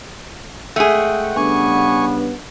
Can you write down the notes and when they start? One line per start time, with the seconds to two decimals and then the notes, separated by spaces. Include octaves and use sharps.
0.76 G#3 A3 G#4 F#5 G5
1.36 C#3 G3 B3 D4 G#5 C#6